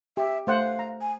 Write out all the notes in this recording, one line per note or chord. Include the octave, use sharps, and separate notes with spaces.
G4 E5
A3 C5 F5 F#5
A#5
G#5